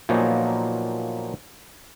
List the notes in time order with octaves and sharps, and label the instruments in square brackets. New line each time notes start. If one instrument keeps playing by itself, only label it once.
[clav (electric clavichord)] A#2 F3 F#3 A#3 B3 D#4